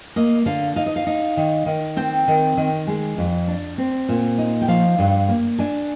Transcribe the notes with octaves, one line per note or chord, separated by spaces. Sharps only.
A#3 D#5
D3 F5
D#4 F5
D#5
F5
D#4
D#3
D#3
C4 G5
D#3
D#3
G#3
F2
D4
C4
A#2
D#4
G5
F3 F5
G2
A#3
D4 G#5